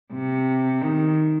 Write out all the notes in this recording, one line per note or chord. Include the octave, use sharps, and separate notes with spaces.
C3
D#3